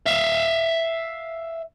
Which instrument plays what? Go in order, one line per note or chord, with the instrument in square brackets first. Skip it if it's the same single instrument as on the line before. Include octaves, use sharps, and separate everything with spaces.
[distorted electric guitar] E5 F5